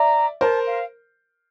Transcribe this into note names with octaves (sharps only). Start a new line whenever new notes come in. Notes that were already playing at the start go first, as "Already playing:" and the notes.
Already playing: D5 E5 A#5
A#4 C5 A5
F5